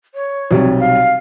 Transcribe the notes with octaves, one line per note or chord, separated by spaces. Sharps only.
C#5
B1 C3 G3
F5